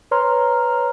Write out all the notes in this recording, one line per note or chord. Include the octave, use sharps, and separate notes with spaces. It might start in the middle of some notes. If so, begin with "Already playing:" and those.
B4 C#5 A#5 C6 F6